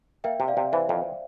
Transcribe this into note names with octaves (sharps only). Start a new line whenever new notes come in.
A#3 E5 G5
C3
D5 F5
C3
E3 C5 E5
F2